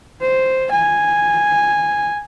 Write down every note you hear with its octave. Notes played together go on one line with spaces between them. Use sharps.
C5
G#5